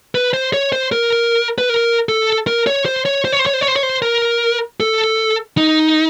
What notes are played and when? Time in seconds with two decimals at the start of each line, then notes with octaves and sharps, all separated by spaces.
0.15 B4
0.34 C5
0.54 C#5
0.72 C5
0.92 A#4
1.58 B4
1.69 A#4
2.09 A4
2.47 A#4
2.67 C#5
2.86 C5
3.06 C#5
3.25 C5
3.32 C#5
3.39 C5
3.46 C#5
3.54 C5
3.61 C#5
3.68 C5
3.76 C#5
3.83 C5
4.02 A#4
4.80 A4
5.58 D#4